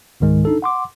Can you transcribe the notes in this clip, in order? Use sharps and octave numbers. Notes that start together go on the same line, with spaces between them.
C#2 G#2 D#3 G#3
D4 D#4 A4
F#5 C6 D6